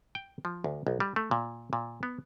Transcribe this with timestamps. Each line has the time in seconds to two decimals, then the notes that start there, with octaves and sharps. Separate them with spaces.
0.15 G5
0.45 F3
0.64 D2
0.87 B1
1.00 G3
1.16 A3
1.31 A#2
1.73 A#2
2.03 B3